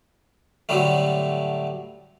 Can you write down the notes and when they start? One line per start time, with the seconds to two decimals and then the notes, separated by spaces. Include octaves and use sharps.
0.69 A2 D3 F#3 G3 A3